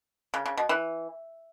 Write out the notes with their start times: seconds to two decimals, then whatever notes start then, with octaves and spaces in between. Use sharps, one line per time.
0.34 C#3
0.46 C#3
0.57 B2
0.69 E3